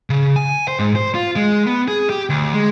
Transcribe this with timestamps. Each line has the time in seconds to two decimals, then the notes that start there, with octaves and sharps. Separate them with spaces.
0.10 C#3
0.36 G#5
0.68 C5
0.79 G#2
0.96 C5
1.15 F4
1.36 G#3
1.67 B3
1.88 G#4
2.10 G4
2.29 D2
2.54 G#3